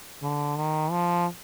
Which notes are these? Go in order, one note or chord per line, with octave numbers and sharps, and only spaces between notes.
D3
D#3
F3